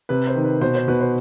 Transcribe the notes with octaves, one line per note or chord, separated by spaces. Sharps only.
C3 B4
C5
D#3
B4
B2 C5
C5
B2 B4
C5